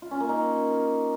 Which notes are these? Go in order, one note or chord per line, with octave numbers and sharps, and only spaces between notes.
F4
C#4
A#3
D#4